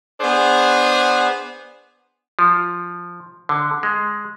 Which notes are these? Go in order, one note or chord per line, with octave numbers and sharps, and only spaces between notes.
B3 D4 G#4 C5
F3
D3
G#3